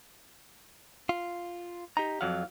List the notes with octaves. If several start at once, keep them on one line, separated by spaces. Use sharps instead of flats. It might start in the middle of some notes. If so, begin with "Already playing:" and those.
F4
D#4 G4 A#5
F2 F#3 F5 F#5